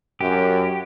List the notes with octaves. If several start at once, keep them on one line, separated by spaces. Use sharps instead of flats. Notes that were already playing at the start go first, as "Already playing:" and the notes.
F#2 G4